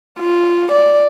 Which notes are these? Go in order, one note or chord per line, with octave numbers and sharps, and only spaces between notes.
F4
D5